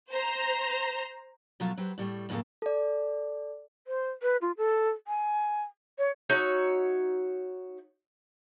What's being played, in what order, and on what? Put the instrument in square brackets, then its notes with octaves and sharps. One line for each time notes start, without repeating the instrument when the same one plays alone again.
[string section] C5 A#5
[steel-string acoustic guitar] B2 F3 F#3 A3 F4
F#3 G4 B4 C5
A2 G3 A3
F2 A2 C#3 F#3 A3 A#3
[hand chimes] A4 D5
[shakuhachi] C5
B4
F4
A4
G#5
C#5
[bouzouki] D#4 F#4 C#5 E5